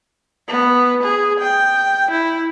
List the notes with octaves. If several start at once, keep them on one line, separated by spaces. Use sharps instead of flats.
B3
G#4
G5
E4